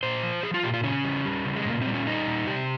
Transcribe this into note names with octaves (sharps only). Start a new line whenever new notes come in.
A#2 C5
F3
F3 G#4
F4
A#2 G4
F4
C#3 C#4
G3
G3
C#3
G#3
A#2 A#3
G3 C4
C#4
G3 D#4
A#2
C3 G4